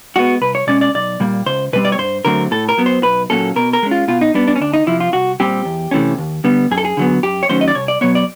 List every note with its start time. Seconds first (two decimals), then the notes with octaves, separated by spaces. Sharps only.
0.16 G#3 B3 F#4
0.41 C2 B4
0.55 C#5
0.67 B2 G#3 C#4 D5
0.81 D5
0.95 B1 D5
1.20 A#2 G3 A#3
1.46 C#2 C5
1.73 B2 G3 C4 B4
1.85 D5
1.92 C#5
1.98 G2 C5
2.25 D3 F#3 A3 C4 A#4
2.51 A2 A4
2.69 A#4
2.78 F#3 B3
2.86 C5
3.03 B1 B4
3.30 A#2 F#3 A#3 C#4 A4
3.56 B2 A#4
3.73 A#4
3.83 G#3 C#4
3.91 F4
4.08 B2 F4
4.21 D#4
4.34 G3 B3 D4
4.48 D4
4.56 C#4
4.61 D2 D4
4.74 D#4
4.86 C3 F3 E4
5.00 F4
5.13 C2 F#4
5.40 A#2 G3 C4 G4
5.65 E2
5.91 C3 E3 A3 C#4
6.18 D#2
6.44 D3 G3 B3
6.71 F#2 G#4
6.78 A4
6.85 G#4
6.97 D3 F#3 B3
7.23 F#2 G4
7.43 C#5
7.49 D#3 F#3 A3 C#4 C5
7.61 D#5
7.68 D5
7.75 C2 C#5
7.88 D5
8.01 B2 F#3 B3 C#5
8.15 D5